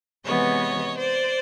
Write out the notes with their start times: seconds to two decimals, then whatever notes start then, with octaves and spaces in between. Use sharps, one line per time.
0.24 C3 E3 G#3 B3 C#5 D#5
0.97 C5 D5